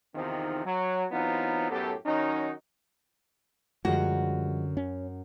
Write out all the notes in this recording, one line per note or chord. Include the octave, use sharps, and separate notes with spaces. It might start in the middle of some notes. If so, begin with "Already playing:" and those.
E2 C3 D#3 F3 C4 D#4
F#3
E3 F#3 B3 C4 D#4 F4
F#2 A2 B3 G4 A4
D#3 F#3 C#4 D#4
F#2 D3 F3 G3 G#3 F#4
C#4